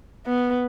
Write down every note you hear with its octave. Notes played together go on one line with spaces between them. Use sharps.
B3